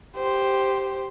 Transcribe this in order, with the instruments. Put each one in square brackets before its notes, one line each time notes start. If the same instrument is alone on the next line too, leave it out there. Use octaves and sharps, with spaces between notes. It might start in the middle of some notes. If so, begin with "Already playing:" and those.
[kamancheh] G4 C5